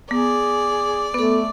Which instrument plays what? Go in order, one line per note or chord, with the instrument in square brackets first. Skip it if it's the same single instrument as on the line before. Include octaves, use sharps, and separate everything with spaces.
[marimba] B3 [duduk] G#4 [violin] D5
[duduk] A3 [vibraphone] B3 A4 [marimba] B4